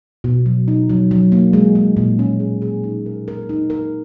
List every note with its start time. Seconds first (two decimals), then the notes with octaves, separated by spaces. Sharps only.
0.24 B2
0.46 F#3
0.68 D#4
0.89 F#3
1.11 F#3
1.32 A#3
1.53 G#3
1.75 G#3
1.97 A#2
2.19 C#4
2.40 G#4
2.62 G#4
2.84 D#4
3.06 A#4
3.28 A#4
3.49 D#4
3.70 A#4